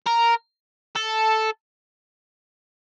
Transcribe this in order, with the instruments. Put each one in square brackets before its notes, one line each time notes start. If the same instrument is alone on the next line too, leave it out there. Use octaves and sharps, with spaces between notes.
[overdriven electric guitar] A#4
A4